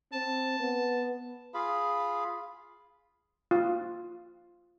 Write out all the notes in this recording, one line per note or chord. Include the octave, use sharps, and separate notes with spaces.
C4 A5
B3
F4 G#4 F5 B5
F4